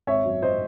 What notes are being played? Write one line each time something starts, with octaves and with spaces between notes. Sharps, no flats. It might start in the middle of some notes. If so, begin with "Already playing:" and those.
G#1 C#5 E5
F#2
C5 D#5